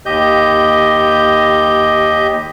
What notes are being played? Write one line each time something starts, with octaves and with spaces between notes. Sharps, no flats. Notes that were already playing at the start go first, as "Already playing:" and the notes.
D#2 G4 D#5 G6